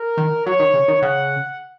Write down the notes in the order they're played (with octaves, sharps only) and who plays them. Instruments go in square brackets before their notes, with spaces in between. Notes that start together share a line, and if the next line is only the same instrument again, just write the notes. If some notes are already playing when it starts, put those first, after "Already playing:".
Already playing: [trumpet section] A#4
[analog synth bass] D#3
[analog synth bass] F#3 [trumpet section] C#5
[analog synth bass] D#3
C#3
D#3
[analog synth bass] C#3 [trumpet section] F#5